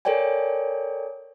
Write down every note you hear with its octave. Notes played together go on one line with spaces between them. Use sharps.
A4 A#4 C#5 D5 G5 G#5